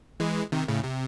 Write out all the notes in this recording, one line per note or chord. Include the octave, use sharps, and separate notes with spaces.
E3 G#3
C3 D#3
A2 C#3
C3